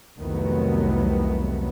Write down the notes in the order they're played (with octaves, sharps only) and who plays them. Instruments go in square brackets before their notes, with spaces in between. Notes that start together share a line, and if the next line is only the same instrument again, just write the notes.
[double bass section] C2 F2 D#3 F#3 A3 B3